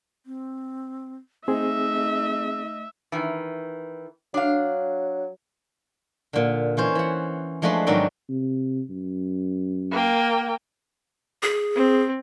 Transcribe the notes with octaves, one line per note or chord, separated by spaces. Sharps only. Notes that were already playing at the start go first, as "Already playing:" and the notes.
C4
A3 C4 D#4 G#4 D#5 E5
D#3 E3
F#3 D4 F5
A#2 D3
E3 C#4 C5
E3 F#5
F3 G#3 A3 D4 B4 C6
G#2 D#3 F#3 C4 D4 D5
C3
F#2
A#3 G5
G#4
C4